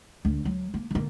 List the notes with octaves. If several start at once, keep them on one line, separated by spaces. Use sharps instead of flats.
D2
F#3
A#3
D3 A#3